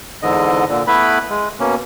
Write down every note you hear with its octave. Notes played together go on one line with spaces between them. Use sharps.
E2 G#2 D3 D#5
A#2 D3
A3 B3 E4 B4 B5
G#3
B2 A#3 C#4